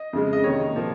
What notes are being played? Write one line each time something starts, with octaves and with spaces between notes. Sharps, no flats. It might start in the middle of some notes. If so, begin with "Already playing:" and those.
Already playing: D#5
F2 C#3 G#3
D#5
C3 D#3 A#3 C#5
A#2 F3 A#3